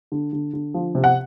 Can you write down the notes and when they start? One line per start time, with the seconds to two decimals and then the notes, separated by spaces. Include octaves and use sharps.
0.12 D3
0.33 D3
0.53 D3
0.74 F3
0.95 C3
1.04 F#5